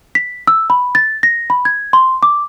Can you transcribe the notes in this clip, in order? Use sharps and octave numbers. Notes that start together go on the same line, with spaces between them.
B6
E6
B5
A6
A#6
B5
G#6
C6
D6